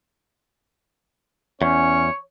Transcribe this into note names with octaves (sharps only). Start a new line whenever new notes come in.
E2 C#4 C#5